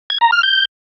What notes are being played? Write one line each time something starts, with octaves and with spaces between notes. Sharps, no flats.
G#6
A#5
F6
G6